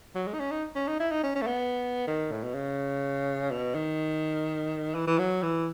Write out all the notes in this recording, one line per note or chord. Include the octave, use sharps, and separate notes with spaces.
F#3
G#3
D#4
C#4
D#4
C#4
D#4
E4
D#4
C#4
C#4
A3
B3
D#3
A2
B2
C#3
B2
D#3
E3
E3
F#3
E3